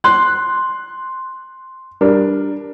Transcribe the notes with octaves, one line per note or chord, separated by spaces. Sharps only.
C6 F#6
G3 D4 A#4